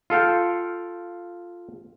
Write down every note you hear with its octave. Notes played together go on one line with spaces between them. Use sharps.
F4 A4 F5 G5